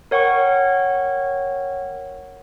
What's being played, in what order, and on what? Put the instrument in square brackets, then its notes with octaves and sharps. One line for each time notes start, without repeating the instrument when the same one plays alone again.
[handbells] A#4 C#5 F#5 G5 C#6